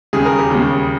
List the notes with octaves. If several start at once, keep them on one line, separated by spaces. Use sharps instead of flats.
D#2 C#3 G3 G#4
A#4
G4
D#2 C#3 G3